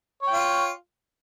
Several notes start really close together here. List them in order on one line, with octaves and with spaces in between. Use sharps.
C#5 G5 F4